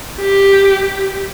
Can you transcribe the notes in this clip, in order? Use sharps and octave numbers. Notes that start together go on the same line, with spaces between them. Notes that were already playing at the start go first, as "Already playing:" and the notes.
G4